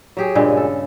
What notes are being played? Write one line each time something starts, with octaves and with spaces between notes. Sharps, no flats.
F#3 G4 G#4
G2 A#2 C#3 G#3
A4